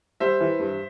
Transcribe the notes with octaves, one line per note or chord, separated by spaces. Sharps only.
G3 C5 E5
E3
G2